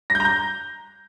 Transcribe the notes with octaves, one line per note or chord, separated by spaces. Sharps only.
A#6
G6
A#5
G6